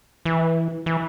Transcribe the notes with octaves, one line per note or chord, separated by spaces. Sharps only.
E3
E3